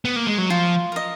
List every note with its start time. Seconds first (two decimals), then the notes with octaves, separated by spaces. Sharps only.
0.05 B3
0.16 A#3
0.27 G#3
0.38 F#3
0.50 F3 F4
0.92 A#4 D#5